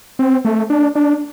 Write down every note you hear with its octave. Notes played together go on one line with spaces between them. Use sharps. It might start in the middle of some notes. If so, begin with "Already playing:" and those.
C4
A3
D4
D4